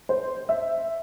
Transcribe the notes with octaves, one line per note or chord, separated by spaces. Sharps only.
C5
E5